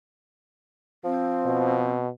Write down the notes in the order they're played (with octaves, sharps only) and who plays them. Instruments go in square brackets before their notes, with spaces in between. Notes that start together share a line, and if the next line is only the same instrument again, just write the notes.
[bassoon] F3 [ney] C4
[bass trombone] B2